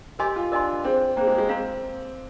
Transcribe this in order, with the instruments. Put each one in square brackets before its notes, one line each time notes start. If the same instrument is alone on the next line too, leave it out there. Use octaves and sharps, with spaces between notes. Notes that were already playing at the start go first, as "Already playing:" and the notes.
[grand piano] G4 [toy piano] A#4 D#5 G#5 C6
[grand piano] F4
[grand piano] D4 [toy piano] A#4 D#5 G#5 C6
[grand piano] C4 [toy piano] G#4 C5 G5
[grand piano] A#3 [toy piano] G#4 C5 G5
[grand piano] G#3
G#3
[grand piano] C4 [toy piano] A#4 F5 A#5